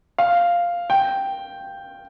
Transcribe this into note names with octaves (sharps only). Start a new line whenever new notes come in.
F5
G5